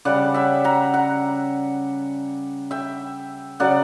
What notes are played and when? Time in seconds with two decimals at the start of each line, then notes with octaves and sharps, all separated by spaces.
0.05 C#3 G3 D5 F#5
0.34 E5 G5
0.64 F#5 A#5
0.94 F#5 A#5
2.71 E5 G5
3.60 C#3 F#3 D5 F#5